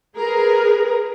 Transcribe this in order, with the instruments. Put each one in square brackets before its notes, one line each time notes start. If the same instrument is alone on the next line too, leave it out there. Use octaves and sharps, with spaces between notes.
[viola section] G#4 A#4 B4